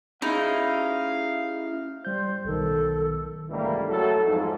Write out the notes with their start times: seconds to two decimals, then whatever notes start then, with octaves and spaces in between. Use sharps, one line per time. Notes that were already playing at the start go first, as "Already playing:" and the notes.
0.22 C#4 D#4 E4 G#4 E5 F5 B5
2.05 G3 C5 G6
2.45 B1 D#3 A4
3.50 C#2 G#2 E3 G3 A3 A#3
3.89 F#3 A3 E4 A4
4.24 F2 G#2